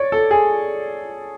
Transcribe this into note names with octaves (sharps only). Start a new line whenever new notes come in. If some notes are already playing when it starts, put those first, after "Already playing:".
Already playing: C#5 D5
A4
G#4